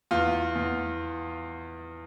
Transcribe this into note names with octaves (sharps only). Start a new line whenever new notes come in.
E2 F4
E2